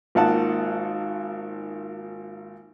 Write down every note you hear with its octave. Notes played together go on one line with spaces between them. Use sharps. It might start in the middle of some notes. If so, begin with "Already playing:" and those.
G#1 A#3 D#4 F4 F#5 A5